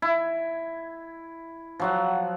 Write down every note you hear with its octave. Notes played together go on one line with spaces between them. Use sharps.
E4
F3 F#3 F#5